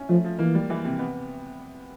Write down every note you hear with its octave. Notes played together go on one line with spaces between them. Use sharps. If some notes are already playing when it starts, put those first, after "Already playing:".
Already playing: C#4 E4
F3 A3
F3
E3 A#3
G3
E3
C3
B3